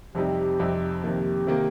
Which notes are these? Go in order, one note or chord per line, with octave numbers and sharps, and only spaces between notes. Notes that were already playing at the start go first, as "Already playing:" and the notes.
F2 C3 G3 C4 D#4 G4
F2 C3 G3 C4 D#4
F2 C3 D#3 A#3 G4
C3 D#3 A#3